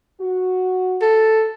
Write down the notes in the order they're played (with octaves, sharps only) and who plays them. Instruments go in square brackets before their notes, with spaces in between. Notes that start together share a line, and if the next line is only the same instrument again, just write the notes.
[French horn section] F#4
[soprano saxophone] A4